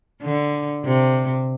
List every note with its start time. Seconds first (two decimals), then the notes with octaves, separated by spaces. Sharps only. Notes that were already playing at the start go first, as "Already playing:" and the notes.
0.22 D3
0.84 C3